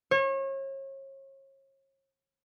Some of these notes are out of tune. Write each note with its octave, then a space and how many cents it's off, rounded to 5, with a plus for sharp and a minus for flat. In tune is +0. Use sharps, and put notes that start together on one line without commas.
C#5 -35